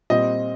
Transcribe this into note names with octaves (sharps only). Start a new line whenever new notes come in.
A#2 G3 C4 D#5